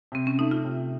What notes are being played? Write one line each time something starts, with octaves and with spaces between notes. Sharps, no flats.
C3 C4
C#4
A3 D#4
F4
C3